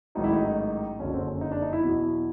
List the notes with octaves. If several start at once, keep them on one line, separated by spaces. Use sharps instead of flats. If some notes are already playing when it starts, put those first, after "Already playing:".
A1 G#2 D#3 F#3 D#4
E4
D#4
F#1 F2 D3 F#3 C#4
C4
C#4
D#4
D4
D#4
E4
E2 B2 F#3 E4